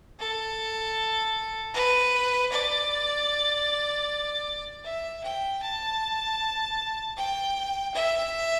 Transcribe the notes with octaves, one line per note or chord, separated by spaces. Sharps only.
A4
B4
D5
E5
G5
A5
G5
E5